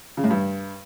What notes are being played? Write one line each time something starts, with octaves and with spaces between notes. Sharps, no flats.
C#3
A2
G2